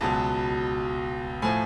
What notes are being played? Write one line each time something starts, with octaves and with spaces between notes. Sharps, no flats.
C#2 B2 F#3 A5
A2 F3 G#5